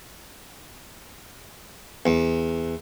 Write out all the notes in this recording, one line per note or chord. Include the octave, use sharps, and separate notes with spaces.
E2